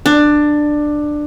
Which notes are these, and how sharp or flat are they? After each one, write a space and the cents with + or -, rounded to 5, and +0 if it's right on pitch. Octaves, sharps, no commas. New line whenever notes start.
D4 +15